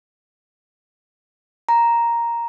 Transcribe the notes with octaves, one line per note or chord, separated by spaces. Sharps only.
A#5